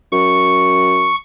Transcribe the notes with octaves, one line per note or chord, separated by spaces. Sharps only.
F#2 C#6